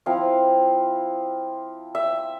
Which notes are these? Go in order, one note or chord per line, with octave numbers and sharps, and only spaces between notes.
F3 C4 E4 F5
E5